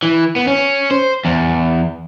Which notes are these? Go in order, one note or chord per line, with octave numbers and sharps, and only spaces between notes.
E3
B3
C#4
C5
E2